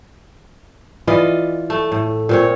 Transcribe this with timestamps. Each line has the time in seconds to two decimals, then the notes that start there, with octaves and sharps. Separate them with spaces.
1.07 E3 F4 D5 D#5
1.70 A3
1.92 A2
2.29 A#2 C4 C#5